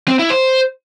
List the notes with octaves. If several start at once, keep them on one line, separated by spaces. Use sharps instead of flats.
C4
E4
C5